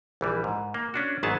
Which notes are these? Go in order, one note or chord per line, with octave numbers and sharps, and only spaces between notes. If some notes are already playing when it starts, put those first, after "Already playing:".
A#1 E3 G3
G#2
A#3
C#4 D4 F#4
G#1 G#2 F#3 B3 G#4 A5